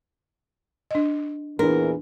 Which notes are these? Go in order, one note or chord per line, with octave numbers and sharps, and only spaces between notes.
D4 D#5
E2 A#2 E3 D4 A#4